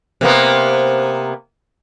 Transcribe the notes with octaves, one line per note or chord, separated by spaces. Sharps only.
C3 A#3 B3